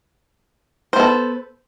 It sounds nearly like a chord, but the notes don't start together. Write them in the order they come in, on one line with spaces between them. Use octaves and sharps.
C5 B3 A4